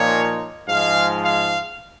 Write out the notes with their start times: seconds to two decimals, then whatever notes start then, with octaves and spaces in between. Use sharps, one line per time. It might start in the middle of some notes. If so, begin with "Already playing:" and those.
Already playing: A#2 F3 A#3 D#4 C#5
0.68 G#2 F3 G#3 F5
1.23 F5